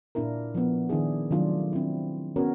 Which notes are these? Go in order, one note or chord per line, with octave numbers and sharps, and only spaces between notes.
A#2 A#3 D4 E4 A#4
F3 B3
D#3 D4 E4 G#4
C3 D#3 F#3 A3 D4 F4
C4 D4 E4
B3 C#4 F#4 A#4 C#5